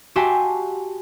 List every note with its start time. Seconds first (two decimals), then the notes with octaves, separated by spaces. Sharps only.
0.16 F#4 G4 E5 G#5 A5 C6